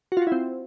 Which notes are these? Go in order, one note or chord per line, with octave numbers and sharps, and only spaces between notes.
F#4
F4
F#4
E4
C4